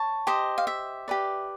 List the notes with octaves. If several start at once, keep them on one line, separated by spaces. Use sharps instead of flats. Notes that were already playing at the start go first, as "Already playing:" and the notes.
Already playing: C#5 A5
G4 C5 D#5
F5
E5
G4 B4 D5